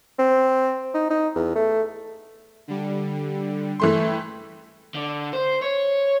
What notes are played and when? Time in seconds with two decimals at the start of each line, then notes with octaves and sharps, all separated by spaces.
0.19 C4
0.94 D#4
1.10 D#4
1.35 E2
1.56 A3
2.68 D3 G3
3.80 E3 A3 G5 B5 C6
4.94 D3
5.33 C5
5.62 C#5